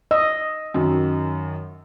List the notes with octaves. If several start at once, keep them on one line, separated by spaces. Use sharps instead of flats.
D#5 E6
F#2 D#3